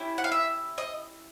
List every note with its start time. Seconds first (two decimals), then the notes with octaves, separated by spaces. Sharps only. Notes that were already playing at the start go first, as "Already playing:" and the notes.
Already playing: C#4 E4 G4
0.18 F#5
0.24 F5
0.32 E5
0.78 D#5